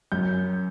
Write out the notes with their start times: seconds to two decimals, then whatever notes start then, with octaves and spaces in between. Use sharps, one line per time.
0.12 F#2 G6